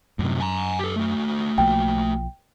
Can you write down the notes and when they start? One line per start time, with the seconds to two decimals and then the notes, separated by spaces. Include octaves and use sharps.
0.19 F#2 A2 C3
0.41 G#5 A#5
0.79 G4 A4
0.96 A3 F#4
1.58 B1 F3 A#3 G5